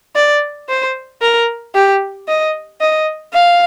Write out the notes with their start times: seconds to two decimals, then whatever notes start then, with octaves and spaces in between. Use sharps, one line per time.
0.16 D5
0.69 C5
1.22 A#4
1.75 G4
2.28 D#5
2.81 D#5
3.34 F5